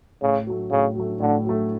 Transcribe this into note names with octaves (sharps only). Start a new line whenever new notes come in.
A2 C#3
F#3 A3
A2 C#3
F#3 A3
A2 D3
F#3 A3